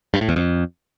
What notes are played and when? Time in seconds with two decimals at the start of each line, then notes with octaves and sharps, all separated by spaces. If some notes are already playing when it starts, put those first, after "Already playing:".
0.14 G2
0.21 A2
0.29 E2
0.36 F2